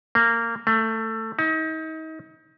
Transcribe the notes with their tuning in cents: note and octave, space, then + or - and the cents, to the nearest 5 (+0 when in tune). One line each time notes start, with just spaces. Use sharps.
A#3 -20
A3 +20
D#4 +35